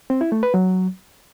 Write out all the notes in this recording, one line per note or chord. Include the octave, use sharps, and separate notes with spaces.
C4
E4
A3
B4
F#3